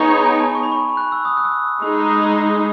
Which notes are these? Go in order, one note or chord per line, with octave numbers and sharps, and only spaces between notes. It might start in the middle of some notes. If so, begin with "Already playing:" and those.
Already playing: B3 D#4 G#4 C#5
B5
G#5
A5
C#6
B5
C#6
F#6
E6
D#6
F#6
E6
G#3 D#4 G#4 B5